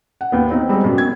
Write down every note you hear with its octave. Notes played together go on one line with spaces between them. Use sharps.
F#5
D#2 B3
C4 D#4
G3 G#3 C4
F#2 B2
G#6